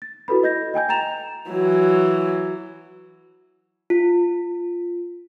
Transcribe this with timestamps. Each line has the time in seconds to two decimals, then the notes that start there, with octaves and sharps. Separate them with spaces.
0.02 A6
0.28 E4 F#4 A4 B4 B5
0.43 D#5 G6 A#6
0.74 D#5 G5 G#5 G6
0.89 G5 A#5 A6 E7 F7
1.49 E3 F#3
3.90 F4